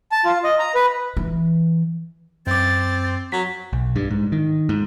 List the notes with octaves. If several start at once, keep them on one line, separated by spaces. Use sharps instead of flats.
A5
F4
D#5
A#5
B4
E3
F#2 C4 D6 A6
F#3 B6
B1
G2
G#2
D#3
G#2